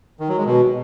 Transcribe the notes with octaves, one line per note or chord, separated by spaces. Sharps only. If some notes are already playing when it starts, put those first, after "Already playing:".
D#3
F#3
G#3
B2